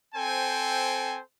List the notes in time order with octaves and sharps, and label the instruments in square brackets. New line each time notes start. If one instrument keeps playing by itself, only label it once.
[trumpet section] C4 A4 C5 G5 G#5